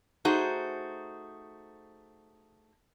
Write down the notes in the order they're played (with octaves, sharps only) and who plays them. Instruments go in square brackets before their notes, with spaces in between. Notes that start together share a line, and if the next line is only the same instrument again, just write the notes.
[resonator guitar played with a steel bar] A3 D#4 F#4 G#4 C5